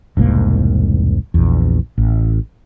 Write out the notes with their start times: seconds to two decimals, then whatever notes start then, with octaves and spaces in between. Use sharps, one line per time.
0.17 E1 C2 G#2 A#3
1.34 A#1 E2
1.98 A1